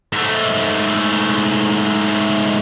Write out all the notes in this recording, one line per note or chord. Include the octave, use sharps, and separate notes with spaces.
G#2 A3